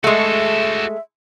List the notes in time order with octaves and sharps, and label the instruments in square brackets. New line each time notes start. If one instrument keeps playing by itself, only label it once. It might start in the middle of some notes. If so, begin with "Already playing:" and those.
[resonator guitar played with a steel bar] G#3 A3 [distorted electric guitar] F#4 A4 [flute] E5